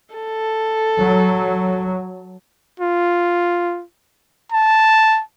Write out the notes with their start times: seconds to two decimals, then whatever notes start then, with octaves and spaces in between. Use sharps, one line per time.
0.15 A4
1.00 F#3
2.80 F4
4.52 A5